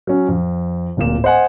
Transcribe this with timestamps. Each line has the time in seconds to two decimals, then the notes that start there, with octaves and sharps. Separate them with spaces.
0.07 F#3 C#4
0.28 F2
0.97 D1 A#2 E7
1.24 C5 D#5 F#5 G#5